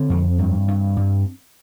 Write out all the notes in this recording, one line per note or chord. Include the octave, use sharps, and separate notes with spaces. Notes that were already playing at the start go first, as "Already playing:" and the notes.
Already playing: D3 C4
F2
G2
G2
G2